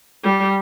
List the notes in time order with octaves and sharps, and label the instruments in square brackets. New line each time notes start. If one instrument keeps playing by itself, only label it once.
[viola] G3